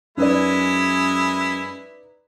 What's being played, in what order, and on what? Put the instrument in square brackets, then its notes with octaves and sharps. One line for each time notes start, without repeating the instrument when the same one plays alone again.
[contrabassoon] F#2 [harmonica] G#3 E4 [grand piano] D#4 B4 D5